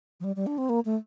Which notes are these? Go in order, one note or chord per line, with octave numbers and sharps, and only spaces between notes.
F3
G3
G3
D4
C4
A#3
A3